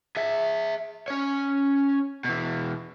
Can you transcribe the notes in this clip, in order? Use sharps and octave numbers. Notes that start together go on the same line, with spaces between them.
G#4 E5
C#4 C#5
B2 E3